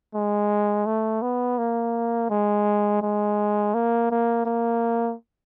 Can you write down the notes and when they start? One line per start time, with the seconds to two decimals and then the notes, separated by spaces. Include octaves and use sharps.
0.14 G#3
0.86 A3
1.22 B3
1.58 A#3
2.30 G#3
3.02 G#3
3.74 A#3
4.11 A#3
4.46 A#3